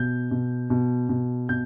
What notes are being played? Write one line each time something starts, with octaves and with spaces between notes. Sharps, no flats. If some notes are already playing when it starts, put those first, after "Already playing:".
Already playing: B2 G6
B2
B2
B2
B2 G6